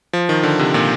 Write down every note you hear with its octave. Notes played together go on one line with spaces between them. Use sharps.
F3
D#3
D3
C3
A#2